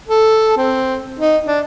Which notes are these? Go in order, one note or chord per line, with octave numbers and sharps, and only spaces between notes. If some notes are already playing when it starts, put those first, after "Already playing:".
A4
C4
D#4
D4